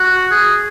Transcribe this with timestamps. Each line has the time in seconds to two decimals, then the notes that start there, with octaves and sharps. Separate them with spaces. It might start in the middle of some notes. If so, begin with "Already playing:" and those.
Already playing: F#4
0.31 G#4